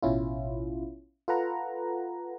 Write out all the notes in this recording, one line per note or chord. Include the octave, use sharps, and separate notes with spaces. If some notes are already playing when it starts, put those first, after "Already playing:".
A1 B2 C#4 E4 F4
F4 A4 B4 F#5 A#5